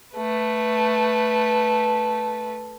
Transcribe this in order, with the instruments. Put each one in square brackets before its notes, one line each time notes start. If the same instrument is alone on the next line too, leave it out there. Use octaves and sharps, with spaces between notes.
[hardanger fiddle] A3 B4